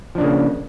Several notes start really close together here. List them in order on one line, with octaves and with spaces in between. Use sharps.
F3 D4 C#3 A#3